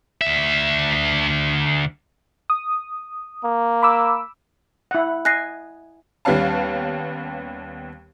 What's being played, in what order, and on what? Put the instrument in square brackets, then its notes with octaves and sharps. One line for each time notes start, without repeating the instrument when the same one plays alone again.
[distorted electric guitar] D2 E5
[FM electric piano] D#6
[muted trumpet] A#3
[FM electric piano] B5 D6 E6
[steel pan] E4 F#5
[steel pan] D#5 G#5 [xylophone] F#6 A#6 C7
[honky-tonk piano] D#2 G3 B3 C#4 F5 A5